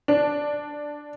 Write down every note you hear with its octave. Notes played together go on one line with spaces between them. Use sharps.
D4